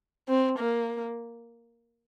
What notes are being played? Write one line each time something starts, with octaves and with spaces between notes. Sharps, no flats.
C4
A#3